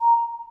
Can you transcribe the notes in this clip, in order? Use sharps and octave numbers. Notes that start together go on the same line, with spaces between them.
A#5